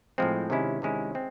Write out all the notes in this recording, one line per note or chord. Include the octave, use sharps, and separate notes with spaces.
A2 F3 G#3 C4
C3 D#3 G#3 C#4 E4
C3 D#3 G#3 C#4 E4
G#3 C4